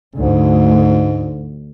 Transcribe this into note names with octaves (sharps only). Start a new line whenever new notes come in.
D2 G#2